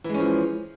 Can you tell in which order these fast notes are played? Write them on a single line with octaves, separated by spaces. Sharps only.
E3 G#3 C#4 F3